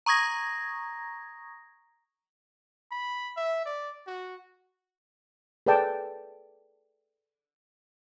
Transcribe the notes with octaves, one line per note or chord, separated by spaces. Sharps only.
A#5 C#6 D#6 G#6 A#6
B5
E5
D5
F#4
G#4 A4 B4 D5 G5 A5